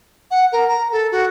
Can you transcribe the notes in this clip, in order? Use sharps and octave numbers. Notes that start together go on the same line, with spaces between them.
F#5
A#4
A#5
A4
F#4